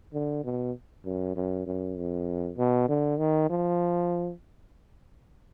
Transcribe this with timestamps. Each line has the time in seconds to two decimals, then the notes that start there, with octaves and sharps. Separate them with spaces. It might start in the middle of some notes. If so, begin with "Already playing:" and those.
0.13 D3
0.44 B2
1.05 F#2
1.36 F#2
1.66 F#2
1.96 F2
2.57 B2
2.88 D3
3.19 D#3
3.50 F3